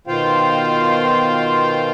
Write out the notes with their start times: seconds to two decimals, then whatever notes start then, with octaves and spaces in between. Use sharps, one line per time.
0.07 B2 D#3 F4 C5 F5 G5